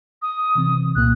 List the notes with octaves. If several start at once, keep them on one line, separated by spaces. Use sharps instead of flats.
D#6
C3 E3 C4
C2 A#2 A#3 F#6